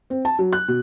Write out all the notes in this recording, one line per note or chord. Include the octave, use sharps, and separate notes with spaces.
C4
A5
F#3
F#6
B2